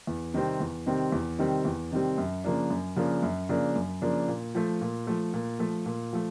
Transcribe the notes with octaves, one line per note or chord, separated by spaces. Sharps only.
E2
C3 D#3 G3 C4
E2
C3 D#3 G3 C4
E2
C3 D#3 G3 C4
E2
C3 D#3 G3 C4
F#2
C#3 F3 A#3 D4
F#2
C#3 F3 A#3 D4
F#2
C#3 F3 A#3 D4
F#2
C#3 F3 A#3 D4
A#2
F3 A3
A#2
F3 A3
A#2
F3 A3
A#2
F3 A3